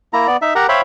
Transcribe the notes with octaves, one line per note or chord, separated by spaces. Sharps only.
A#3 E4 A#5
B3 D5
D#4 E5
G4 A#4 F#5 A#5
C5 C#5 E5 F5 G5 B5